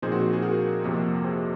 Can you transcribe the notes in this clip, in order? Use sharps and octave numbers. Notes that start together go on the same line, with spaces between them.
A#2 F3 C4 D#4 G#4 C5
F#4
F#4
G#4
F#4 A#4
F2 C3 F3 A#3
G#4 C5